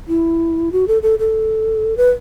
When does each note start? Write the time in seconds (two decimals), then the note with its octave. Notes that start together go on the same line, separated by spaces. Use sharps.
0.08 E4
0.72 F#4
0.88 A4
1.03 A4
1.19 A4
1.97 B4